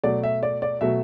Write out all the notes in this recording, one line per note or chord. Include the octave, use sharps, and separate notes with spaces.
B2 F#3 A3 D5
E5
D5
D5
B2 F#3 A3 E5